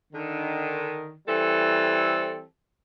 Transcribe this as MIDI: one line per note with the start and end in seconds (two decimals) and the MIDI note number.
0.13 1.14 50
0.13 1.14 51
1.27 2.43 52
1.27 2.43 55
1.27 2.43 60
1.27 2.43 69